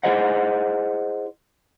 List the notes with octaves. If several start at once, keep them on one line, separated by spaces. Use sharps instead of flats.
E4 G#4 C5 D#5 F#5